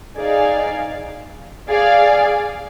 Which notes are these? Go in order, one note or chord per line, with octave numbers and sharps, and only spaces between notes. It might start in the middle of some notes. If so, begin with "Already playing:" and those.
D#4 G#4 D5 F5
G#4 D5 F5